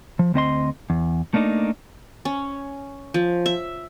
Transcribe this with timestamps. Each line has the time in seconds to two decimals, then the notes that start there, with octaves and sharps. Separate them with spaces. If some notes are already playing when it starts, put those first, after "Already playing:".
0.19 F3
0.34 D2 C4 D#5 C6
0.90 E2
1.34 A3 A#3 D4 D#4
2.25 C#4
3.14 F3
3.46 E5